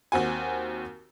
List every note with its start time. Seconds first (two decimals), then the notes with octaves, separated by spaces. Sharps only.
0.12 D#2 C4 F#4 G#5